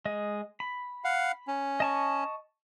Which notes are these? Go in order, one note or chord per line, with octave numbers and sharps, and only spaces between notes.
G#3 D#5
B5
F5 F#5
C#4
D#5 A5 C#6